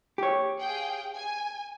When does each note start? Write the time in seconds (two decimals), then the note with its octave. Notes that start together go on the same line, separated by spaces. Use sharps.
0.18 G4 C#5
0.62 G#4 F5 G5
1.16 G#5